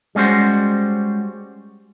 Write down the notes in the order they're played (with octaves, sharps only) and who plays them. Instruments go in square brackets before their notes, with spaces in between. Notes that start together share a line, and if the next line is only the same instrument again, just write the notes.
[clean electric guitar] G3 G#3 C#4 F#4 C5